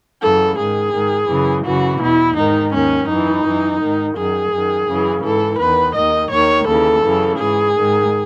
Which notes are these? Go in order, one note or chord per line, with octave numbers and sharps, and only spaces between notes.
F#2 C#3 E3 A4
G#2 D#3 G#4
G#2 D#3
F#2 C#3 E3
F#2 C#3 E3 F#4
E2 B2 E4
G#2 D#3 D#4
D#2 D#3 C#4
F#2 E3 D#4
F#2 E3
G#2 D#3
F#2 D#3 G#4
F#2 D#3
F#2 C#3 E3
G#2 E3 A4
E2 D#3 B4
D#2 D#3 D#5
D#2 D#3 C#5
D#2 C#3 E3 A4
F#2 C#3 E3
G#2 E3 G#4
G#2 D#3